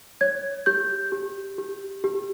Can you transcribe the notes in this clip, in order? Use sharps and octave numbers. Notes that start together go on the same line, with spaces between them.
C#5 G#6
G4 G6
G4
G4
G4